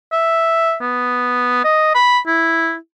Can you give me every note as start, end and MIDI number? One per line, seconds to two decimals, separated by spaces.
0.12 0.76 76
0.82 1.59 59
1.64 1.94 75
1.95 2.19 83
2.27 2.75 64